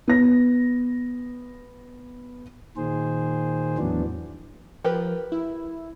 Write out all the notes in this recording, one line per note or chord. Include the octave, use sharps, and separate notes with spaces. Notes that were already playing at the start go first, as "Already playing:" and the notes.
B3 A#6
A#2 D#3 G#4 C5
E2 A2 E3 F#3 B3 D4
F3 G4 A#4 B4
E4